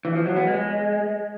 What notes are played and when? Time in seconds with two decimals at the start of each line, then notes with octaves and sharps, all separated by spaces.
0.05 E3
0.15 F3
0.26 F#3
0.36 B3
0.47 G#3